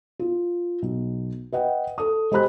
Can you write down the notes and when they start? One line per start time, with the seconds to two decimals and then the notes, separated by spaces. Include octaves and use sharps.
0.19 F4
0.82 B1
1.52 B4 D#5 F#5 G5
1.98 A4 D#6
2.31 G#3 G4 C5 B5 F#6